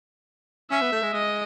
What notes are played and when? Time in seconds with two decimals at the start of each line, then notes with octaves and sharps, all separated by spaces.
0.71 C#4 E5
0.81 B3
0.92 A3
1.03 G#3
1.13 G#3 D#5